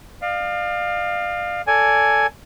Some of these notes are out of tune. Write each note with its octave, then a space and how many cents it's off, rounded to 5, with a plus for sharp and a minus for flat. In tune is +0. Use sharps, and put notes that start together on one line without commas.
D5 +45 F5 +10
A4 +10 D5 -20 G#5 +5